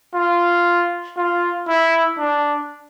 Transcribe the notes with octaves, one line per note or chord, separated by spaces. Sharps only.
F4
F4
E4
D4